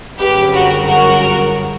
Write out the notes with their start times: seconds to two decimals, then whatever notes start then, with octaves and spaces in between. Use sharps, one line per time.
0.18 G1 F#2 C#3 G4 B4
0.53 F#4 A#4
0.86 F#4 A#4